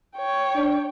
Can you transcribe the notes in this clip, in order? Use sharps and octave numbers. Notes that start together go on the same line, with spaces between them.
C#5 G5
D4